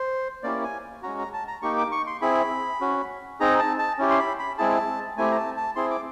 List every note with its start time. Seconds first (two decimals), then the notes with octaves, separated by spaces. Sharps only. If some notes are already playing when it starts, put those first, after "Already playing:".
Already playing: C5
0.43 A#3 C#4 E4 G4 D5
0.64 G#5
1.03 G#3 C#4 F#4 A#5
1.19 A#5
1.33 A5
1.48 A#5
1.62 A#3 D#4 G4 C#6
1.78 D6
1.92 C#6
2.07 C6
2.21 C4 E4 G#4 B5
2.81 C#4 F#4
3.40 C4 D#4 G#4 A#5
3.59 A5
3.79 A5
3.99 C#4 E4 G4
4.10 C6
4.19 B5
4.39 B5
4.58 G#3 C4 E4 G#4 A5
5.17 A3 C4 E4 G4 G#5
5.32 A#5
5.37 A5
5.57 A5
5.76 C4 E4 G#4 C6
5.91 D6